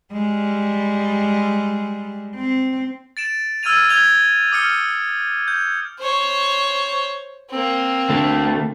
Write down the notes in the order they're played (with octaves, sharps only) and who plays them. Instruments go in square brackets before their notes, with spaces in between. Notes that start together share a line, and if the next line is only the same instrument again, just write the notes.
[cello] G3 G#3
C4
[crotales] A6 D7 E7
E6 F6 G#6 A6 D#7 F7
E6 G6 G#6 F7 G7
D6 D#6 F6 C#7 G7
G6
[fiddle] C5 C#5
A#3 C4
[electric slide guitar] D3 A3